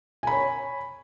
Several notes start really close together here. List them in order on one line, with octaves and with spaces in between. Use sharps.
G#5 B5 C#5